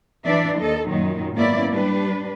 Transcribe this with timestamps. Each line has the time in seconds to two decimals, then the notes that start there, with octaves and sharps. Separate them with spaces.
0.25 E3 D4 D5 E5
0.60 D#2 A4 D#5
0.90 F#2 A#2 D#3 F#3
1.35 G#2 A#3 B3 C#4 E4 D5
1.74 G3 D4 B4